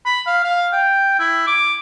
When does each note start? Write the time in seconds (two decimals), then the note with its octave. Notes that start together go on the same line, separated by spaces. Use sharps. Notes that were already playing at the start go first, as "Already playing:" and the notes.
0.06 B5
0.27 F5
0.44 F5
0.73 G5
1.19 E4
1.47 D6